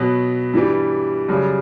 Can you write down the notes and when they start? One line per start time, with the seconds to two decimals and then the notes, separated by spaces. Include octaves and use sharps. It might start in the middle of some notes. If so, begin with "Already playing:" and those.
Already playing: B2 F#3 B3
0.54 G2 E3 G3
1.29 F#2 C#3 G3